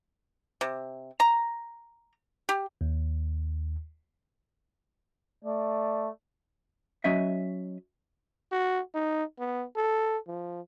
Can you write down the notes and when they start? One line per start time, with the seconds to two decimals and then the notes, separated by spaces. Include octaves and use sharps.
0.61 C3
1.20 A#5
2.49 G4
2.81 D#2
5.44 A3 D5
7.04 F#3 C#4 D#5 E5
8.52 F#4
8.95 D#4
9.39 B3
9.77 A4
10.28 F3